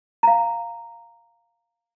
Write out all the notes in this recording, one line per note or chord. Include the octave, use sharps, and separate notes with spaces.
F5 A#5